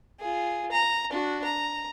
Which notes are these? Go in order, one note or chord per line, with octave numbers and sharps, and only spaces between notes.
F4 G#4
A#5
D4 F#4
A#5